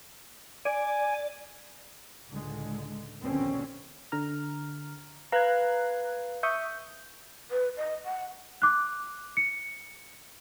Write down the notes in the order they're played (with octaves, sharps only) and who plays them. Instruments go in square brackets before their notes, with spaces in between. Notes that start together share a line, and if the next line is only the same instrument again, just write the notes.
[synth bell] D5 [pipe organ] G#5
[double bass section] C#2 A2 D3 G#3
A#1 D#2 B2 D3 C4 C#4
[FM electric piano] D3 A#5 F6
[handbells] B4 F5 [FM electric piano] A#5 F#6 G#6
[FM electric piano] E5 C#6 D#6 [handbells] G6
[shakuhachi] B4
D#5
F#5
[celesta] D6 F#6
C#7